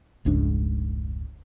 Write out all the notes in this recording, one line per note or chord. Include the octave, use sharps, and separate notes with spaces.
F1 C#2 G#2 D4